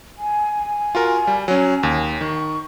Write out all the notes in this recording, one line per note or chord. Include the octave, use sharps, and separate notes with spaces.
G#5
F4 F#4 A#4
G3
F#3 C#4
D#2
D#3 C#6